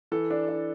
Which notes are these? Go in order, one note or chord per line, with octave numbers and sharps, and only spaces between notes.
E3 A4
D4
D4